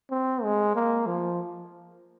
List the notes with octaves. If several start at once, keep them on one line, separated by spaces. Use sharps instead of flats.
C4
G#3
A#3
F3